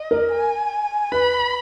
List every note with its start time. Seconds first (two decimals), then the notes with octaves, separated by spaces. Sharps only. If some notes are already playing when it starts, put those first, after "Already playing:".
Already playing: D#5
0.11 A#4
0.31 G#5
1.12 B4 B5